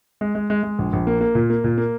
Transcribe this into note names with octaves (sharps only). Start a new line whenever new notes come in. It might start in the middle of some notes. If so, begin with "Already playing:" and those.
G#3
G#3
G#3
G#3
A#1
A#1
A#3
A#3
A#2
A#3
A#2
A#3